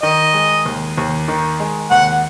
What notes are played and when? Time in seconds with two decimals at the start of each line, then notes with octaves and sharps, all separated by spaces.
0.03 D#3 D#5
0.34 G#3
0.66 D#2
0.98 D#2
1.28 D#3
1.60 G#3
1.91 D#2 F#5